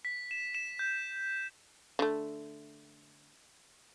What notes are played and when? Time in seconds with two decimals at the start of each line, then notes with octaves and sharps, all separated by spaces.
0.05 B6
0.31 E7
0.55 E7
0.79 G6
1.99 D3 G3 A3